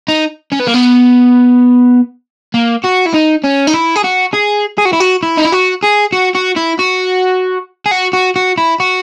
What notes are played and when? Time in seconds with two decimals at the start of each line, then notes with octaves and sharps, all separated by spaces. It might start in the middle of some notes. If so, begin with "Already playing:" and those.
0.08 D#4
0.52 C#4
0.60 B3
0.68 A#3
0.74 B3
2.54 A#3
2.84 F#4
3.06 E4
3.14 D#4
3.44 C#4
3.67 D#4
3.74 E4
3.96 G#4
4.04 F#4
4.33 G#4
4.78 G#4
4.85 F#4
4.93 E4
5.00 F#4
5.23 E4
5.37 D#4
5.44 E4
5.52 F#4
5.83 G#4
6.13 F#4
6.35 F#4
6.57 E4
6.79 F#4
7.86 G#4
7.91 F#4
8.13 F#4
8.36 F#4
8.58 E4
8.80 F#4